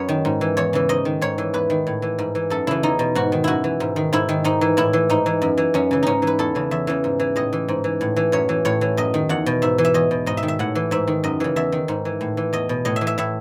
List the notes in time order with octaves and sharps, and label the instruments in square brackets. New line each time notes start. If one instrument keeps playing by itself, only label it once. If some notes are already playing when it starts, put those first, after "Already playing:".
Already playing: [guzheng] F#2 B4 C#5
D#3
G#2
E3
E2 C#5
C#3 E3
G#2 D#5
D#3
G#2 C#5
E3
E2 B4
D#3
A2
E3
G#2
E3
F#2 A4
C#3 E3 E4
E2 D#4
B2
G#2 F#4
D#3
F#2 E4 F#4
E3
G#2
D#3
G#2 E4
D#3
G#2 D#4
E3
A2 E4
E3
G#2 D#4
E3
F#2
E3
F#2 C#4
C#3 E3
G#2 C#4 D#4
E3
B4
E2 A4
C#3 E3
E2 E5
C#3 E3
G#2
E3
A2 D#5
E3
G#2
E3
A2
E3
F#2 C#5
E3
A2 C#5
E3
F#2 D#5
D#3
E2 F#5
B2
G#2 E5
E3
E5
E2 D#5
B2
G#2 D#5
E5
D#3
E5
A2 F#5
E3
G#2 E5
D#3
F#2 D#5
C#3 E3
E2 E5
D#3
G#2
E3
A2
E3
E2 D#5
B2
A2 D#5
E5
E3
E5
A2 E5